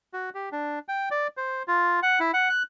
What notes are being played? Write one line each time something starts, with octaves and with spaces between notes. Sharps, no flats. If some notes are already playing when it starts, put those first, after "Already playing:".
F#4
G4
D4
G5
D5
C5
F4
F#5
E4
F#5
F#6